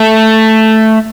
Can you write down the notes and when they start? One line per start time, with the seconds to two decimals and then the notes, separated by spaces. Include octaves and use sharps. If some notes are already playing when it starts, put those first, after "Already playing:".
Already playing: A3